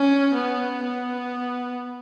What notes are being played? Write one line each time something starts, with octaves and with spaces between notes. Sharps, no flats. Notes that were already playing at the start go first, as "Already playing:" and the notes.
Already playing: C#4
B3
B3